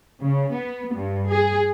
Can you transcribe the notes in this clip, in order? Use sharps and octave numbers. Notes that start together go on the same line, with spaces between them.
C#3
B3
G2
G#4